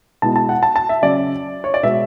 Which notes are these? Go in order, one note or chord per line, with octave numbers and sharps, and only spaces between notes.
B2 G#3 B3 E4 A5
A5
F#5
A5
A5
E5
C#3 F#3 C#4 D5
C#5
D5
B2 G#3 B3 E5